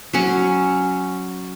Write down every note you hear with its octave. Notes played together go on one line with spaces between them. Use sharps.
F#3 C#4